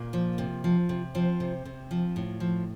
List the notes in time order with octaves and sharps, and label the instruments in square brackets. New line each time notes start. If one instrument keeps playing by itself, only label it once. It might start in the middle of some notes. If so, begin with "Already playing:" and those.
Already playing: [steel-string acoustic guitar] A#2 A#3
F3
C3
F3
C3
F3 C4
C3
C3
F3
A2
F3